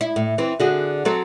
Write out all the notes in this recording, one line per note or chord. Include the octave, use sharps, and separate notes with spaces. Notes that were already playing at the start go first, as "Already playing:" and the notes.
E4
A2
E3 C4
D3 F#4 G#4
F#3 C4 A4